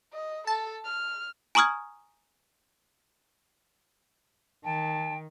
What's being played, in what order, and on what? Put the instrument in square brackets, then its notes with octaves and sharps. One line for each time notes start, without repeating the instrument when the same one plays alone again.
[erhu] D#5
[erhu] A4 [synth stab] A5
[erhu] F6
[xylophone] G#5 A#5 C#6 D#6 F6 G#6
[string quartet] D#3 [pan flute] G5 [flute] A5